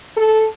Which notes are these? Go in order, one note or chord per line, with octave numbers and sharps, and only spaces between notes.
A4